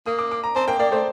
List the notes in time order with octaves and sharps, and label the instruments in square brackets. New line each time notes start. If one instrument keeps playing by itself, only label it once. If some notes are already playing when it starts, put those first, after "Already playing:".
[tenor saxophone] A#3 [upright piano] D#6
[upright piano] D6
D6
A#5
[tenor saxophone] C4 [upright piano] A5
[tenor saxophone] A#3 [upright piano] G5
[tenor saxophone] A#3 [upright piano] D5
[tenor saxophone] A3 [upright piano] C5